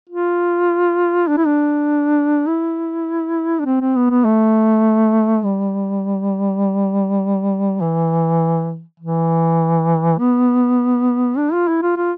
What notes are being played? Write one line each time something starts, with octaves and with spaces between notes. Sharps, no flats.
F4
D4
E4
D4
E4
D4
C4
C4
B3
B3
A3
G3
E3
E3
B3
D4
F4
E4
F4
F4